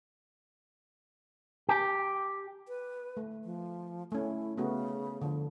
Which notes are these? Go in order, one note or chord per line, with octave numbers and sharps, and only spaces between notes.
G4
B4
A3
F3
A3 C#4 E4
C#3 A3 B3 F#4
D3 F3